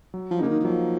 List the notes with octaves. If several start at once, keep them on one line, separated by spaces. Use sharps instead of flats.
F#3
F3
C#3 A#3 D#4
D#3
D#3
F3 F#3